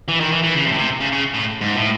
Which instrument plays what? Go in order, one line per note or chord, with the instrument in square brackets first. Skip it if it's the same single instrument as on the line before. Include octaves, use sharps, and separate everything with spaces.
[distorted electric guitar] E3
D#3
E3
E3
C#3
C3
A2
C3
C#3
C#3
A2
G#2
A2